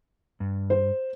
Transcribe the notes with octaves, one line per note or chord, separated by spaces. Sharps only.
G2
C5